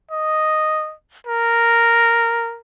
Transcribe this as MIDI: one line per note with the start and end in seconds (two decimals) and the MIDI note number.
0.11 0.94 75
1.27 2.59 70